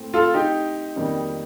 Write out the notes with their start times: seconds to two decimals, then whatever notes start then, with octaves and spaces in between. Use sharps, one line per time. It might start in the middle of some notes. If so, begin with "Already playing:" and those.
Already playing: A2 A3 C4
0.14 F4 A4
0.34 D#4 G4
0.96 F2 D#3 G3 A#3